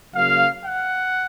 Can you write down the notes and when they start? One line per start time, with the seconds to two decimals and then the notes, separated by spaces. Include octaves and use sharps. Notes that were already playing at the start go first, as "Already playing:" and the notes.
0.14 C#3 F#3 A#3 F5
0.65 F#5